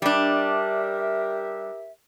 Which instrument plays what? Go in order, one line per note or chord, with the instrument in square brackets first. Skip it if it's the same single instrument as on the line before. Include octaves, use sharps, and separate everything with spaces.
[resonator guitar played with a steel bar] G3 D4 [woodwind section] G4 A#4 E5